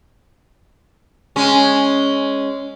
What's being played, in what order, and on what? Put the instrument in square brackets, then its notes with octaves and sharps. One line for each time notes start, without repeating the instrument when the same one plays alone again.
[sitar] G#3 C#4